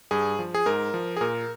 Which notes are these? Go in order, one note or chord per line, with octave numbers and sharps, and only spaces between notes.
G2 G#4
F3
G#4
G#2 A#4
F3
G#4
A#2 A#4